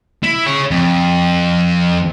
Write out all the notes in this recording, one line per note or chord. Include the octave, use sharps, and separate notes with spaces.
E4
G#4 C#5
F2